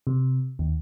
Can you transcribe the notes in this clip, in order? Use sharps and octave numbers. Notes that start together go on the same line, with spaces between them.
C3
D#2